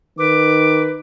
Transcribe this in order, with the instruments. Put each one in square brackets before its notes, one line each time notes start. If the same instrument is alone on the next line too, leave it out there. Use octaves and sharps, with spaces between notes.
[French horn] D#3 [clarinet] B4 [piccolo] D6